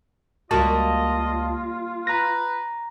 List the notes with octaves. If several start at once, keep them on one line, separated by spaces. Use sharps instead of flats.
C#2 G3 A#3 F4 F#4 D#5 A5
B4 A#5 A#6